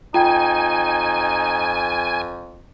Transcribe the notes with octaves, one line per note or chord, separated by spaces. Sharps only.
F2 D#4 F4 G5 G#5